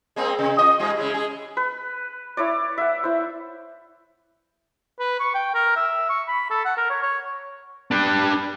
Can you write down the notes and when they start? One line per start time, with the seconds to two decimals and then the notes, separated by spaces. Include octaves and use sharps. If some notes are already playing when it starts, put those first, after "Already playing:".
0.16 G#3 A#3 C4
0.39 C3
0.58 F4 D#5
0.80 G#2 G3
0.97 C#3 G#3 E4
1.14 G#3 G#4
1.57 B4
2.37 E4 C#5 D5
2.78 E5 F#5
3.04 E4 C5
4.99 B4
5.20 C#6
5.34 G5
5.54 A#4
5.76 E5
6.09 C#6
6.28 B5
6.50 A4
6.65 F#5
6.77 A#4
6.90 C#5
7.03 C#5
7.91 D4 B4